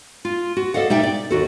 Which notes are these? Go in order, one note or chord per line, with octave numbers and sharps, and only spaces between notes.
F4
F#4
A4 D5 D#5 F5 F#5
B2 D#4 D5 E5 G5
D5
D#2 F#4 A4